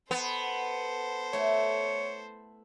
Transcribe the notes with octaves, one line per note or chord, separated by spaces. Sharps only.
B3 A4 C5
A3 E4 C#5